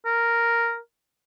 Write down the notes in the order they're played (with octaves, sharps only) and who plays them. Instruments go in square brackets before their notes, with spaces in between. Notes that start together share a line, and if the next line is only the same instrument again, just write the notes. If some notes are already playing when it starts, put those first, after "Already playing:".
[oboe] A#4